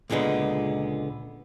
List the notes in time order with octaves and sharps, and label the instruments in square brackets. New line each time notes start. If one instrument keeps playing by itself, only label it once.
[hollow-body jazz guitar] C#2 A#2 D3 G#3 B3